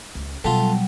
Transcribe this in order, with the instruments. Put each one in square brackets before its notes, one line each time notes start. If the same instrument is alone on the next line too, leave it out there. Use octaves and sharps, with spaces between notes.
[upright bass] C#2
[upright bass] B2 [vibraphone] F#3 G3 [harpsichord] F4 A4